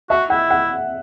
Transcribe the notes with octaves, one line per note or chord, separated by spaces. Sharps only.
F#4 E5
E4 F#5
F#5